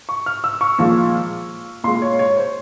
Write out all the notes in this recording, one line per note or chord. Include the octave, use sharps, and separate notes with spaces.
C#6
F6
E6
C#6
A#2 F3 G#3
A#2 G#3 C6
C#5
C#5
C5